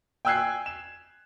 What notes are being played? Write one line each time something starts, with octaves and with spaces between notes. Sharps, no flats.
G5 G#5 E6 F#6 G#6 C7
E7